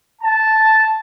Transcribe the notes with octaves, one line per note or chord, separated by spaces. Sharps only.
A5